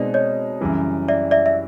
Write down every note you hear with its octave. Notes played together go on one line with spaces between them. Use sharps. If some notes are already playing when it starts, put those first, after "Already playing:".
Already playing: B2 G#3 C4 D#4 D5
C#5 D#5
F#2 C#3 E3 G3
D5 E5
D5 E5
E5